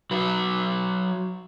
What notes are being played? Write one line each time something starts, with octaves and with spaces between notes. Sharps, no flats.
F#3 B4